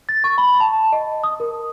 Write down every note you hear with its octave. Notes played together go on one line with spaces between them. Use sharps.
A6
C#6
B5
A5
D#5
D#6
A#4